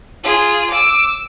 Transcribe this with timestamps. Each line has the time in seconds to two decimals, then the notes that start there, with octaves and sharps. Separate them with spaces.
0.24 F4 G#4
0.70 D6 E6